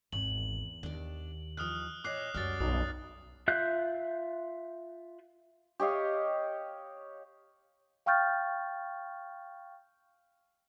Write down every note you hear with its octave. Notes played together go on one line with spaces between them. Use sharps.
G#1 E2 F#7
D#2 D4 D5
D#3 F3 D#6 F6 F#6
A#2 C#5 D#5 D6 F#6 C7
C#2 F#2 G3 F#4 D5 F6 A6
B1 D#6
F4 E5 F#6 G6
G4 C#5 D#5 F5
F5 G5 C#6 F6 G6 A6